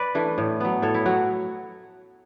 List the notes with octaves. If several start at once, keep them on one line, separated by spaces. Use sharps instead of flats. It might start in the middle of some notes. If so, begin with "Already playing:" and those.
Already playing: B4 D5
E3 A3 D4
A2
F#3 B3
A2 A4 C#5
E4
F#3 F#4